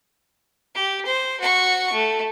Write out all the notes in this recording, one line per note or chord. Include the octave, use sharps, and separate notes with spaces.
G4
C5
F#4 C#6
A3